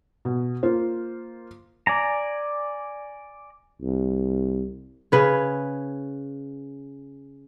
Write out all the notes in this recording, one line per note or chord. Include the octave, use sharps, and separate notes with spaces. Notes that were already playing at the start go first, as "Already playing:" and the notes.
B2
A#3 F4 C5
D5 G#5 A#5
C2
C#3 B4 C#5